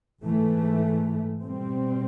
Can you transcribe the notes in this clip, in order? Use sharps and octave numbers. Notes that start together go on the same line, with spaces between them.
G#2 E3 A3
B2 G3 C4